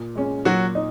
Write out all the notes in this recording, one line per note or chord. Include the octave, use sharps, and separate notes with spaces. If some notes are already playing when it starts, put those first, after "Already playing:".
Already playing: A#2
G#3 C#4
A#2 F#3 F#4
D#4